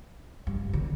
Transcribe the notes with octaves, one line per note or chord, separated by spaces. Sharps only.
G2
D3